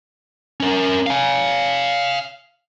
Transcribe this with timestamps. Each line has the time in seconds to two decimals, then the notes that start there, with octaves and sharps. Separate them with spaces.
0.60 C#4 A#4
1.07 F5 G#5